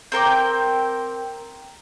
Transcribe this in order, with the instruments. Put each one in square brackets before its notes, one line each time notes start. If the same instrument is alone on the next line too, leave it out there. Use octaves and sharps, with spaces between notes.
[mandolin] C4 A#4 G5 D6